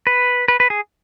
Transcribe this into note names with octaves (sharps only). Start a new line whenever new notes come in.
B4
B4
B4
G#4